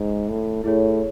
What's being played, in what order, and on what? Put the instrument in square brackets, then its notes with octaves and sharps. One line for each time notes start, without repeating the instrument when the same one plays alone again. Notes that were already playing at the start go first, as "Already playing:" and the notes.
Already playing: [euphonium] G#2
A2
[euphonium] A2 [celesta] E4 G#4 C#5